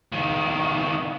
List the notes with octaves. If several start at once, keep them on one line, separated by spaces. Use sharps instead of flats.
C#2 D#3